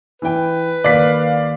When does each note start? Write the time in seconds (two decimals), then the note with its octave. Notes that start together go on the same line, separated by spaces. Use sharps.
0.22 E3 B4 G5
0.84 D#2 D5 F5 B6